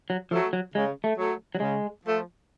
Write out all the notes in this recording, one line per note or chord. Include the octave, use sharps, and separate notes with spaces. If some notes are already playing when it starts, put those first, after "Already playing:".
F#3
F3 F#3 A3
F#3
C#3 G#3
A3
F#3 A3
F#3
C#3 G#3
F3 A3